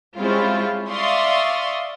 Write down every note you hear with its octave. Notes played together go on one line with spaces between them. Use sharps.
G3 G#3 C4 C#4 E4 F4
D5 E5 F5 C6 C#6 D#6